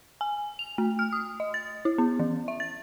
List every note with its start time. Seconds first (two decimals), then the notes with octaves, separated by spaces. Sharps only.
0.21 G#5
0.59 F7
0.78 A3
0.99 F6
1.13 D#6
1.40 D#5
1.54 A6
1.85 E4
1.98 B3
2.19 E3
2.48 E5
2.60 A6